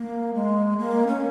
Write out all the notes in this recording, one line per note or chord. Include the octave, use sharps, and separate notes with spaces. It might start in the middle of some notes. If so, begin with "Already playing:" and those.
Already playing: A#3
G#3
A#3
C#4